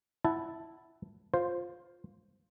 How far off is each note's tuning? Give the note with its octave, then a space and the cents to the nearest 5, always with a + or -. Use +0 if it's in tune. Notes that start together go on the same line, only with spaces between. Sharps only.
E4 +0 F#5 +20 A5 +0
F4 +10 C5 +0